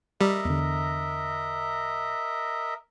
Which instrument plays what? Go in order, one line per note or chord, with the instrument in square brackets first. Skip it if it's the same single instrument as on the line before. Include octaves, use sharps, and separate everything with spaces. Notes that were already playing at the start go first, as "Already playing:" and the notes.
[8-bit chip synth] G3 [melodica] A#4 D#5 E5
[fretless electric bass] E2 D3